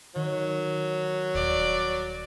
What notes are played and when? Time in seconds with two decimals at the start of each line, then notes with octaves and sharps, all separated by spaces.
0.16 D#3 F#3
1.35 D#1 D5